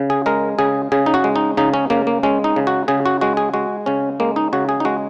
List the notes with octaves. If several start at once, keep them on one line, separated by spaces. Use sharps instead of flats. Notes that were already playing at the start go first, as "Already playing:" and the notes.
Already playing: C#3
G#4
G#3 A#4
C#3 G#4
C#3 G#4
D#4
F#4
G#3
D#4
C#3 D#4
C#4
C#3 A#3
A#3
G#3 C#4
D#4
C#3
F#4
C#3 G#4
F#4
G#3 F#4
G#4
G#3 F#4
C#3 C#4
G#3 A#3
D#4
C#3 F#4
G#4
D#4
G#3 F#4